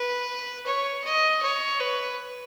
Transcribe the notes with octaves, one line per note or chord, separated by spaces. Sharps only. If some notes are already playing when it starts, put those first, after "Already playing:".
Already playing: B4
C#5
D#5
C#5
B4